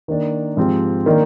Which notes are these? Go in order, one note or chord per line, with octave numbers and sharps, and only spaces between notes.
D#3 A#3 D4
G#2 F3 C4 G4
D#3 A#3 D4